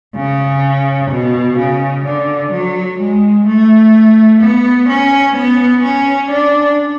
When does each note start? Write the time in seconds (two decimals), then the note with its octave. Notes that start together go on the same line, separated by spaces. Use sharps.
0.16 C#3
1.10 B2
1.58 C#3
2.05 D3
2.52 F#3
2.99 G#3
3.47 A3
4.40 B3
4.89 C#4
5.36 B3
5.82 C#4
6.30 D4